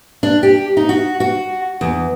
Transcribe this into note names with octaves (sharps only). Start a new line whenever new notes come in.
D4
G4
D#4
F#4
F#4
E2